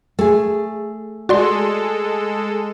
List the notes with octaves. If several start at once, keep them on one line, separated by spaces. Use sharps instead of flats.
A3 G#4
G#3 F#4 A4 D5 C6